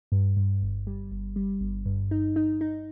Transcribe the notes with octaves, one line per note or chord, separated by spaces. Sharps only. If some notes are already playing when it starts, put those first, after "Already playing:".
G2
G2
G1
G3
G1
G3
G1
G2
D#4
D#4
D#4